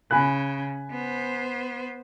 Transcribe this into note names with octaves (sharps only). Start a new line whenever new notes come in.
C#3 G#5 B5 F#6
B3 C5